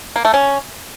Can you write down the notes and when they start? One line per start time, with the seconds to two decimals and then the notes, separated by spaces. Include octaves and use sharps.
0.16 A#3
0.25 A3
0.34 C#4